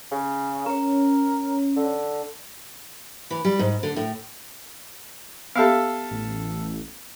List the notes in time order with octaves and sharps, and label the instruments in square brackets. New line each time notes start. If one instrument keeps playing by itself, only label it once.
[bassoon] C#3
[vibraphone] C#4 C#5 [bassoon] A#4
[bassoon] D3
[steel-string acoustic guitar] E3
G3
G#2
D3
A2
[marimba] B3 G4 [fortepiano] A4 E5 F5
[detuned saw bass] A1